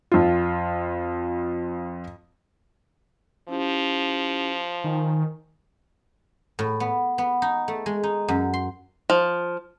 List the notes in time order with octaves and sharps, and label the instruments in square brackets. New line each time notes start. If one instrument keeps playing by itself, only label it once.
[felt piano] F2 F4
[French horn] F3 [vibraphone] C#4 E4 G4
[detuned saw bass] D#3 [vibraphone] G#5
[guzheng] A2
B3
B3
D#4
A3
G#3
D#4
F#2
C6
[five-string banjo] F3